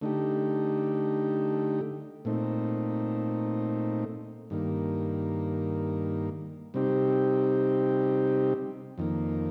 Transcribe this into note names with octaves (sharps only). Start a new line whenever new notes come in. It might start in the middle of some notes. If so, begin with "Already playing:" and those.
D3 A3 D#4 G4
A#2 A3 C4 D#4
G2 D#3 A#3
C3 G3 C4 D#4 G4
F2 D#3 A#3